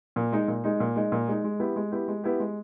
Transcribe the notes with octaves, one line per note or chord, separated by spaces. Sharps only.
A#2
G#3 D#4
A#2
G#3 D#4
A#2
G#3 D#4
A#2
G#3 D#4
G#3
B3 E4 G4
G#3
B3 E4 G4
G#3
B3 E4 G4
G#3